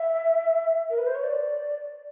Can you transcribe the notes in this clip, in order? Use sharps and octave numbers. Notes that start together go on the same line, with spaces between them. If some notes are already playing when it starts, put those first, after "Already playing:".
Already playing: E5
A#4
B4
C5
C#5
D5